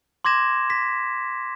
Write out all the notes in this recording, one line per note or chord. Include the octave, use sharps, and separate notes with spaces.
C6 D6 G#6 A#6 E7
A#6 B6